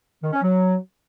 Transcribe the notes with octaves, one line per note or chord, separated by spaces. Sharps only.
D#3
C#4
F#3